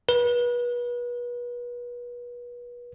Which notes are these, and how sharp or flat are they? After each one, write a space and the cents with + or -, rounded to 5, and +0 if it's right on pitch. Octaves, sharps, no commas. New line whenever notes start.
B4 -35